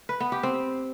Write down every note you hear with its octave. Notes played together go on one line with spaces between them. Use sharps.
B4
B3
G4
C4